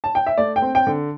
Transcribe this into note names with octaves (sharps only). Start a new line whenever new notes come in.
A5
G5
E5
A3 D5
G5
C4
G5
D3